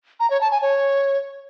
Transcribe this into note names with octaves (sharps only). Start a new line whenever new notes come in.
A#5
C#5
A5
G#5
C#5